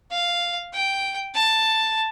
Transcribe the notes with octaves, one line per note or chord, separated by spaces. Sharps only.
F5
G5
A5